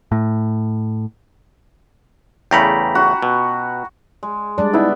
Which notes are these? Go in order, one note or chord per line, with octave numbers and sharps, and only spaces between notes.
A2
E2 C#3 A3 G5 A#5 B5
F#4
B2
G#3
G3 G#3 D4 D5
B3 D#4 E4 G#4 E5